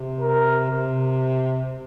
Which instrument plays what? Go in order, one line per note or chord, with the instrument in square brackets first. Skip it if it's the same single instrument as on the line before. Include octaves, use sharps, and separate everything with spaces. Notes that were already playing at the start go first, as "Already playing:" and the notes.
Already playing: [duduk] C3
[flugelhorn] A#4
[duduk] C3